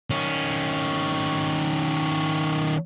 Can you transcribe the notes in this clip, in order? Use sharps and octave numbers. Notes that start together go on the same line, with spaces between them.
D#3 C#4